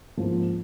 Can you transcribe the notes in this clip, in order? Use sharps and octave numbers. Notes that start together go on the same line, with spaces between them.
G#2 F3 A#3 C#4